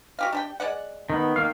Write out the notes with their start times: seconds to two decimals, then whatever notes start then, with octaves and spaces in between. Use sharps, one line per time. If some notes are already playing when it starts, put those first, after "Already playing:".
0.19 F#4 G4 F5
0.32 D4 G4 G5
0.60 G#3 D5 F#5
1.10 D#3 B3
1.36 D#3 A#3 F5